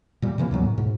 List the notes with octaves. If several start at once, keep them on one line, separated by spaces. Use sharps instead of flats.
A#2 G3
C3 E3 F3 A#3
D#2 G#2 F#3 B3
A2
G#2 B2